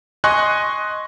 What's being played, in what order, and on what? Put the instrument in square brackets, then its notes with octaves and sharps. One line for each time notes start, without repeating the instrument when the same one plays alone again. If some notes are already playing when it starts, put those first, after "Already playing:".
[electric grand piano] D#5 G#5 C6 C#6 F#6